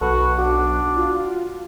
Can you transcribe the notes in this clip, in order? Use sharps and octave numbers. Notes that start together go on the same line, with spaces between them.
B1 F#4 A4 B4
D4 F#4 F#5
F4